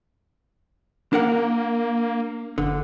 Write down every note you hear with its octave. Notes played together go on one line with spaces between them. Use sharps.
A#3 D4 A#4 F#5
F#1 D3